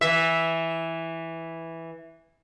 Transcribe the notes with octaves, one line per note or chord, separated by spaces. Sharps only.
E3 E5